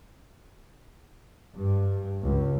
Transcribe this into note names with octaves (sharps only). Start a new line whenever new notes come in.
G2
C#2